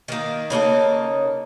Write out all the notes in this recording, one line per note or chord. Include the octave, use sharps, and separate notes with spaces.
D#3 A#3
C#3 A#3 D#4 A4